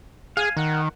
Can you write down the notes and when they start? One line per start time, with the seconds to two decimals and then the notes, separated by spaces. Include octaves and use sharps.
0.37 G#4 F5 G#5
0.57 D#3 A#4 F#5